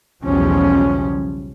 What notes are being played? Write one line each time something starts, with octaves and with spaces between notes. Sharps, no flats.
B1 E2 C#3 F3 G3 C#4